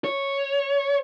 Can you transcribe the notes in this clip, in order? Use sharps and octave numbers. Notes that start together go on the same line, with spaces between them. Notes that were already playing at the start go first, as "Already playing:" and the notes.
C#5